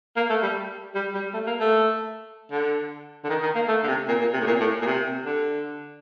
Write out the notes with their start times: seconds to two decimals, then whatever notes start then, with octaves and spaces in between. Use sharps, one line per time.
0.16 A#3
0.30 A3
0.43 G3
0.95 G3
1.14 G3
1.34 A3
1.47 A#3
1.60 A3
2.51 D3
3.24 D3
3.29 D#3
3.43 D#3
3.55 A#3
3.68 A3
3.84 D3
3.88 C3
4.08 A#2
4.21 A#2
4.33 C3
4.41 A2
4.47 A#2
4.60 A2
4.82 A#2
4.86 C3
5.25 D3